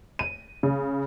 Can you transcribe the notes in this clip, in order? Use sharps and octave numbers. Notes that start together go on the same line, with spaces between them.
D#7
C#3